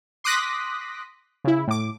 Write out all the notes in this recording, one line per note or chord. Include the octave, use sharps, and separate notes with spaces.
C6 D6 D#6 F#6 A#6 B6
C#3 E4
A2 D6